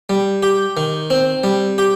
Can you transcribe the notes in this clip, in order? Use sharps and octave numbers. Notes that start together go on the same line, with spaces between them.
G3
G4
D#3
C4
G3
G4